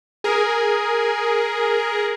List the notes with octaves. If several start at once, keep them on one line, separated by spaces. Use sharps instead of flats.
G#4 A#4